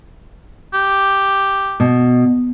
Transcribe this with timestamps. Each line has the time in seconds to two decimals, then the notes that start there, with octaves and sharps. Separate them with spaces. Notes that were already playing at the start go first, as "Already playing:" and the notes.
0.74 G4
1.80 B2